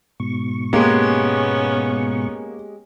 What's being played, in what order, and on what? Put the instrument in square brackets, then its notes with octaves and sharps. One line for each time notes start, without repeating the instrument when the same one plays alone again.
[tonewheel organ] G#2 B2 C#6
[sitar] G#3 G4 [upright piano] A#3 [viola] B3 C#4